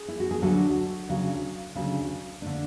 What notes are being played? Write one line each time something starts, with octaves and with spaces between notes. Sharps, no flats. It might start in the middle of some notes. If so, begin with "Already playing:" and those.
Already playing: G#4
E4
F#4
G#4
D2 D3 F#3 F#4 A4
D2 C#3 F#3
D2 C#3 F#3
D3 A3 D4